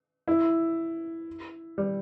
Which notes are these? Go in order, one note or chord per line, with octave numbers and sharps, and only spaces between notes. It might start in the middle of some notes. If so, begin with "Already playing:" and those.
E4
G3